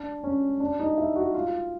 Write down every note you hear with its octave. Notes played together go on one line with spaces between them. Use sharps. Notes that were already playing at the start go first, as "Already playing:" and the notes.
Already playing: D4
C#4
D4
D#4
E4
F#4
F4